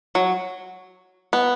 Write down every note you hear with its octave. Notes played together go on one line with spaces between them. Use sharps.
F#3
B3